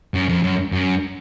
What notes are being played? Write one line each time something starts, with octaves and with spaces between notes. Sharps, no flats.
F#2
F2
F#2
F#2